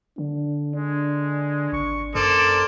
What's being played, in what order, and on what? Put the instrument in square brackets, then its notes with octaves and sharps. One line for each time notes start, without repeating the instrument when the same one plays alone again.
[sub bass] D3 [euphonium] D4
[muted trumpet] G#3 [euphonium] D4
[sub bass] G#1 [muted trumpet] C#6
[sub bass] F#2 [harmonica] A#3 A4 C5 [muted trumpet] D5